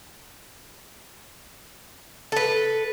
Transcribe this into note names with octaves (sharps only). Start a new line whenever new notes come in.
A4 B4